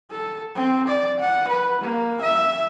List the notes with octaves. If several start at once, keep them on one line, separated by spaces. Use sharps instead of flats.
A4
C4
D5
F#5
B4
A#3
E5